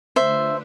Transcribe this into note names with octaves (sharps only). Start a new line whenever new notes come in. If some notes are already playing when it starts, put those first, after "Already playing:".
D3 A3 D4 F4 B4 C5 E5